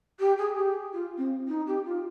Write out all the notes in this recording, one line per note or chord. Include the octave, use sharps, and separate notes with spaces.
G4
G#4
G4
F4
C4
D#4
G4
F4